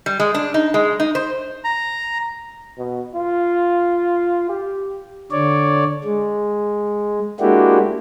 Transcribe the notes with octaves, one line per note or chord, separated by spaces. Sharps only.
G3
G#3
D4
D#4
G#3
D#4
C5
A#5
B2
F4
G4
D3 C#5 D5
G#3
G#3 A#3 D4 E4 F#4 G4